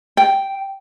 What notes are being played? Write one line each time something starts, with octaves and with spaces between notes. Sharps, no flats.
G5